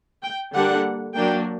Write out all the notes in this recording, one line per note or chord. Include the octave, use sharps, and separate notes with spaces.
G5
D3 G3 A#3 D4 F#5
F#3 A#3 D4 G5